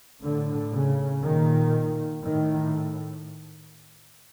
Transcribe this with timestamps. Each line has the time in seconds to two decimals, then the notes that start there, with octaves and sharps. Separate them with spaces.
0.23 A2 D3
0.73 C#3
1.23 A#2 D#3
2.24 A2 D#3